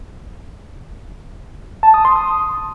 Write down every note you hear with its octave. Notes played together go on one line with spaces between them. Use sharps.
A5
D#6
C6
D#6